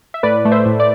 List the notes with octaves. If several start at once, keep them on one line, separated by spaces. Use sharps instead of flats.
E5
A2 B4 D5
A3
C5 E5
A2
D5